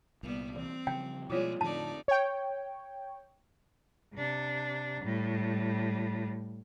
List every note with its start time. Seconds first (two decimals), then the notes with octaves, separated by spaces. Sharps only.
0.23 C2 A#2 G3 B3
0.56 E3 C4
0.87 C#3 F3 G3 G5
1.30 B2 F3 G3 G#3 A#3 E4 F4 C#5
1.61 F2 A2 D3 F3 D#4 D5 A5
2.08 C#5 G5
4.14 C3 D4
5.03 A2 G3